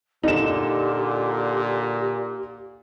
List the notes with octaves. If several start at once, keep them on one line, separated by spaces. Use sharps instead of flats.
A#2 D3 D#4 G4 E7